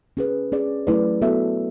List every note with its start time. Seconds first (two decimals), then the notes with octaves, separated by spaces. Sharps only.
0.17 C#4 G#4 B4
0.52 C#4 G#4 D5
0.87 F#3 A3 E4 B4 D5
1.22 B3 F#4 A4 E5